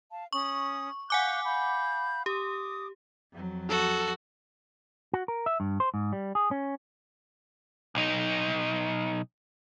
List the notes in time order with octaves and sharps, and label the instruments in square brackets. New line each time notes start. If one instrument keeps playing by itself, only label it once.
[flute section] F5 A5
[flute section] C#4 D#6 [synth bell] C#6
[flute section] F5 F#6 G6 [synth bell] F#5 G#5 D6
[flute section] F5 B5 G6
[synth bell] G4 [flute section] D6 D#6
[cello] F2 F#3
[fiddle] F#4 [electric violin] A4
[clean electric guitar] F#4
A#4
E5
G2
C5
G#2
G3
G#4
C#4
[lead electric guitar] B1 D#4